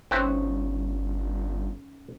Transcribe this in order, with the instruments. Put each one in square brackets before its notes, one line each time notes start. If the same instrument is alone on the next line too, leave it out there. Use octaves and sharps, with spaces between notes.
[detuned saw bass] G1 [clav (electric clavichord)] C4 E4 B4 [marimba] C#4 D#4 C#5